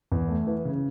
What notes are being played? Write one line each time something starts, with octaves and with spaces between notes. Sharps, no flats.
E2
A3
E3
C#3